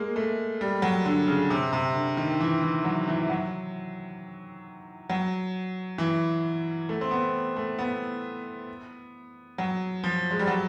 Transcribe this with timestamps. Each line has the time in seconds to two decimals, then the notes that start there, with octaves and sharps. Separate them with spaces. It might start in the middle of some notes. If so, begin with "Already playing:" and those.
Already playing: G#3 A#3
0.16 A3
0.61 G3
0.82 F#3
1.06 D3
1.27 C#3
1.50 C3
1.73 C3
1.94 D3
2.17 D#3
2.40 E3
2.62 E3
2.85 F#3
3.08 E3
3.29 F#3
5.10 F#3
5.98 E3
6.89 A3
7.01 C4
7.11 B3
7.56 A3
7.78 B3
9.58 F#3
10.04 F3
10.31 G#3
10.39 G3
10.47 F#3